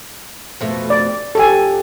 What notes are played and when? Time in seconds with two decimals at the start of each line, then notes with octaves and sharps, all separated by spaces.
0.61 F2 B2 A3
0.90 D5
1.35 F2 G4 A4 G#5